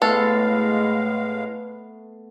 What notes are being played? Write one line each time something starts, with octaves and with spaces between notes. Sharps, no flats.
A2 G#3 A3 B3 A4 B4 F5